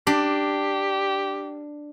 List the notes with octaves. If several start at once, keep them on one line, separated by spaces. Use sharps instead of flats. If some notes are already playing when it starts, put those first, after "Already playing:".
D4 G4